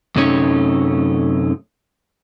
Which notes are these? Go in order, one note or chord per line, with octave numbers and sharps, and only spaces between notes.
F#2 C3 A3 C#4 D#4 C#5